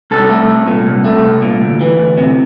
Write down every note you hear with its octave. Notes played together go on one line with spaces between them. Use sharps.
C2 A4
A3
C2
A#2
C2
A3
C2
A#2
D2
E3
D2
C3